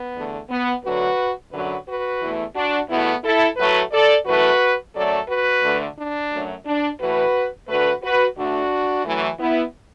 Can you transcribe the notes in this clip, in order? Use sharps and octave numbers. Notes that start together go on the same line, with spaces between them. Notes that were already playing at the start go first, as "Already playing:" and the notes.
Already playing: B3
E2 D3 A3
B3
D2 D3 F#3 F#4 B4
F#2 D3 F#3 F#4 B4
F#4 B4
E2 E3 A3
D4 F#4
E2 B2 A3 B3 E4
E4 A4
A2 F#3 A3 F#4 B4
A4 D5
F#2 E3 A3 F#4 B4
F#2 F#3 A3 A4 D5
F#4 B4
D2 D3 A3
D4
F#2 F#3 A3
D4
A2 E3 A3 F#4 B4
D2 D3 A3 F#4 B4
F#4 B4
D2 D3 A3 D4 F#4
F#2 E3 A3
B3 E4